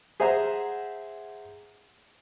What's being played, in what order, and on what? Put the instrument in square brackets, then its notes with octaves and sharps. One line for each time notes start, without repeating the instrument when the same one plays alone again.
[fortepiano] G#4 C5 E5 F#5 A#5